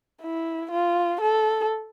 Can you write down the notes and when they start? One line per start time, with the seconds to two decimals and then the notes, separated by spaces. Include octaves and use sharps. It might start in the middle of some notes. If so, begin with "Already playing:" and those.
0.23 E4
0.72 F4
1.21 A4